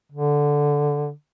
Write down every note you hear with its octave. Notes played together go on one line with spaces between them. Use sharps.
D3